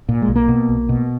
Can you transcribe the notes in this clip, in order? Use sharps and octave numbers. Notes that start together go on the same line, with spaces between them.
A#2
G#3
B1
A#3
B2
B1
B2